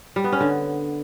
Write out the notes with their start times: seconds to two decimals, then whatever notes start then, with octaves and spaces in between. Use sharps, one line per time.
0.16 G3
0.24 B3
0.32 C#4
0.41 D3